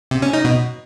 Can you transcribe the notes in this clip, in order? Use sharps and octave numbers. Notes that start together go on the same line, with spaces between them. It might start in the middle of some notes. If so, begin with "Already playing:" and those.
C3
C#4
D#4
B2